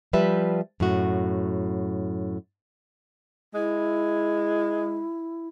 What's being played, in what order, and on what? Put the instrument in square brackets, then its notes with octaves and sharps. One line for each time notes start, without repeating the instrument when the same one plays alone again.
[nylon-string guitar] F3 G3 B4 E5
F#2 A2 F#4
[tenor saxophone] G#3 [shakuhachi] E4